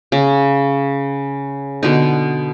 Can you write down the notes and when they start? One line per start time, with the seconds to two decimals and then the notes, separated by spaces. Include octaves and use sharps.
0.12 C#3
1.83 B2 D3 D#4